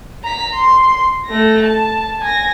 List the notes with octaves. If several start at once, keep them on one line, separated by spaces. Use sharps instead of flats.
A#5 B6
C6
A3 A#6
A5
G#5 A#6